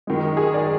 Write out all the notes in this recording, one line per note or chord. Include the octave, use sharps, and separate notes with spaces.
F#2 D#3 G#3
G#4
D5